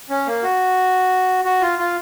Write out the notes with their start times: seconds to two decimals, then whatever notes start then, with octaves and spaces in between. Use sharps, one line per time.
0.10 C#4
0.27 A#3
0.43 F#4
1.45 F#4
1.61 F4
1.79 F4